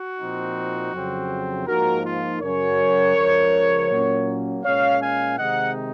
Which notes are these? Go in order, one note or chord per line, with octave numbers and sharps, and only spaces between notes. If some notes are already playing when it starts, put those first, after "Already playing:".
Already playing: F#4
A#2 F3 C4 D#4
F2 C#3 F#3 C4
G#2 F3 A#3 D#4 F#4 A#4
F4
F#2 C#3 F#3 C#4 A#4 C#5
C#2 C#3 F3
A#2 F#3 A#3 C#4
A#2 G#3 C#4 C#5 F5
F5 G#5
C3 D#3 G#3 C4 D#4 D#5 F#5